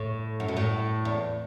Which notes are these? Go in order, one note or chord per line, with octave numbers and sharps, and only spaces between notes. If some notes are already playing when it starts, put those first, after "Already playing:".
Already playing: A2
F#2
B2
A2
E2